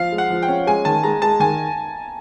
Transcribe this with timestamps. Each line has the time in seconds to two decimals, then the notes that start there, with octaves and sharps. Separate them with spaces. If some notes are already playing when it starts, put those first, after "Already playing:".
Already playing: F3 F5
0.12 G#3
0.18 F#5
0.30 F3
0.43 G5
0.48 C#4
0.67 G#3 G#5
0.85 D#3 A5
1.04 G#3 A#5
1.22 G#3 A5
1.40 D#3 G#5